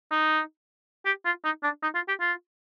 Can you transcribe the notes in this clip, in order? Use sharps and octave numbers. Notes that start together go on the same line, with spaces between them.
D#4
G4
F4
D#4
D4
D#4
F4
G4
F4